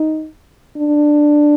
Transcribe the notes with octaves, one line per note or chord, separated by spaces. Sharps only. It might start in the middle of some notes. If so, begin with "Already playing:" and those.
Already playing: D#4
D4